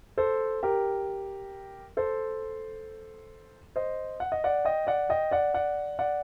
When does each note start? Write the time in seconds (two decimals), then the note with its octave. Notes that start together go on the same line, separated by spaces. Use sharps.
0.18 A4 C5
0.63 G4 A#4
1.97 A4 C5
3.76 C5 D#5
4.20 F#5
4.32 D#5
4.44 D5 F#5
4.65 D#5 G5
4.87 D5 F#5
5.09 D#5 G5
5.31 D5 F#5
5.54 D5 F#5
5.99 D5 F#5